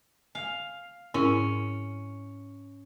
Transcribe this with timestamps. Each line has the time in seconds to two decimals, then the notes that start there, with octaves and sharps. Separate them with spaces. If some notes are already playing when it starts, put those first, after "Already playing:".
0.35 F5 G#5
1.14 G#2 C#4 E4 A#4